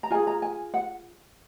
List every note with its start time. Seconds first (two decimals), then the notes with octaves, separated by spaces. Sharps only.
0.03 A#5
0.10 F4 G#5
0.14 G#4
0.27 A#5
0.42 G#5
0.74 F#5